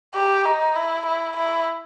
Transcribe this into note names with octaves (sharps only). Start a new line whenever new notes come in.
G4
D#4
E4
E4
E4